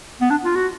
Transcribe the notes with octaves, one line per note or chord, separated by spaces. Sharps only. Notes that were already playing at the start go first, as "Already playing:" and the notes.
B3
D4
F4
F#4